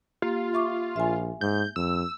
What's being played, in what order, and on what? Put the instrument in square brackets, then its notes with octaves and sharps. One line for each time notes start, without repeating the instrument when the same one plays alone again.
[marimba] A#3 G4 [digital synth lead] F4
[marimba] E5 C#6 D6
[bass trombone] A#1 [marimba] E5 G#5
[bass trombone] G#2 [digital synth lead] G6
[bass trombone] F2 [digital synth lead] E6